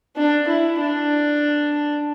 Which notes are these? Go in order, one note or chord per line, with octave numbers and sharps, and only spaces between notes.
D4
E4
D4